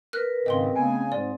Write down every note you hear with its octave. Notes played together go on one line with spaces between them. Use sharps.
A#4 B4 F6 F#6
D#2 G#2 C#3 C4 D#5 G5 C6
C#3 A3 B3 G#5
G#2 G#3 C4 D5